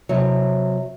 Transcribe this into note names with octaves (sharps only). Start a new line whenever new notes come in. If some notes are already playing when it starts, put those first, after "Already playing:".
C3 F#3